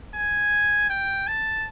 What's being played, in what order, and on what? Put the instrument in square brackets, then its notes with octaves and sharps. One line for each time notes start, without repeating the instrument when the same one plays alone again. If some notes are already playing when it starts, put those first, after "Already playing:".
[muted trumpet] G#5
G5
A5